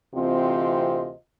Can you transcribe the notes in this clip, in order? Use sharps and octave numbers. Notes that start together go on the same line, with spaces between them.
D2 C3 E3 C4 F4 D#5